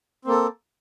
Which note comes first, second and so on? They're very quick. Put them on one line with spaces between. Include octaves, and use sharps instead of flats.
C4 A#3 A4